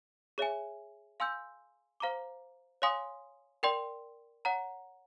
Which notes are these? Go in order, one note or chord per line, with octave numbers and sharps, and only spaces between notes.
G#4 C#5 E5 G#5
F5 G#5 C6 E6 G6
C5 F5 A#5 D6
C#5 F5 G#5 C6 D#6
A#4 D5 G5 C6
C#5 F#5 A#5